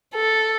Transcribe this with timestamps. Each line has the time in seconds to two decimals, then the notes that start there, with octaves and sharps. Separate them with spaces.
0.15 A4